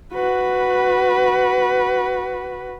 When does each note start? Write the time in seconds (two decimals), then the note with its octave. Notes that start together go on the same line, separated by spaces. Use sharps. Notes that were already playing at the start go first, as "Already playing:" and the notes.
0.13 F#4 B4